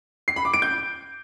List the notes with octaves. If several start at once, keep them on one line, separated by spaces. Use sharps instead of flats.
C7
B5
D6
D7
G6